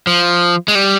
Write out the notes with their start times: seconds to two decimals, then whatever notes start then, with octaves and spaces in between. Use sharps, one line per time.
0.07 F3
0.68 G#3
0.75 G3